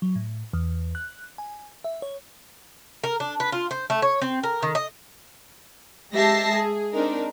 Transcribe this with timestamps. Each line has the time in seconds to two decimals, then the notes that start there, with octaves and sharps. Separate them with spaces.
0.02 F#3
0.16 A2
0.53 E2
0.95 F#6
1.38 G#5
1.84 E5
2.02 C#5
3.04 A#4
3.20 D4
3.40 B4
3.52 F4
3.71 C5
3.90 A3
4.02 C#5
4.22 C4
4.43 A#4
4.63 D#3
4.75 D#5
6.14 G#3 G4 E5 A5 A#6 C7
6.52 G#4
6.93 C4 D4 D#4 A#4